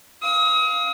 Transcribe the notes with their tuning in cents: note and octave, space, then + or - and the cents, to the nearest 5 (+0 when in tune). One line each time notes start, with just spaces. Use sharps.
F5 +0 D#6 +40